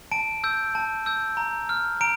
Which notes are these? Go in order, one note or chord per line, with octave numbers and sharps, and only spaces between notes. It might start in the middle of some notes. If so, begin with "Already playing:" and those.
A5 D7
E6 G6
A5
E6 G6
A#5
F6
A#5 D7